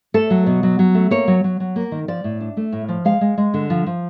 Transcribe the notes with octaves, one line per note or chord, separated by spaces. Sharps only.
A3 A4
F#3
B2
F#3
F#3
A3
A#3 C#5
F#3
F#3
F#3
A#3
D#3
F3 D5
A2
D4
A3
A2
F3
G#3 F5
G#3
G#3
D3
F3
F3